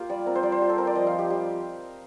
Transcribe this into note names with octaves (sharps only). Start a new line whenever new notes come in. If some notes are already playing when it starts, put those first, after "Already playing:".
Already playing: A#3 F4 G4 F5
G3 D5
C4 A#4
C5
G3 D5
C5
F4 G4
A4
C4 A#4
D5
F3 D#5
F5
F3
G4
G3 G4